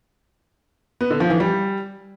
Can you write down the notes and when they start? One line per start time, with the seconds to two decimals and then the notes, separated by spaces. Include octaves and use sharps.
1.01 B3
1.10 D3
1.20 F3
1.30 E3
1.40 G3